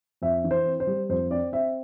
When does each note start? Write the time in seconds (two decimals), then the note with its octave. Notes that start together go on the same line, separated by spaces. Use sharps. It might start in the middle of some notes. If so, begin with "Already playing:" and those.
0.22 F2 E5
0.44 E3
0.51 C5
0.66 C4
0.80 C5
0.87 G3
1.09 F2 C5
1.30 C4 D5
1.52 C4 E5